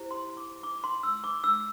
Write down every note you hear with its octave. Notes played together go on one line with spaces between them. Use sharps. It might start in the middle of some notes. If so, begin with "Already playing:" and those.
Already playing: E4 G4 C5
C6
D6
D6
C6
E6
D6
E6